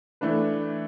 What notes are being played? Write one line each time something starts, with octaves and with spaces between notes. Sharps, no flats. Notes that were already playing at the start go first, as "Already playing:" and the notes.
E3 A3 D4 B4